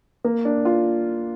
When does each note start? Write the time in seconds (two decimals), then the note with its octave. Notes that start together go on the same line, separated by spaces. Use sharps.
0.24 A#3
0.45 D4
0.65 F4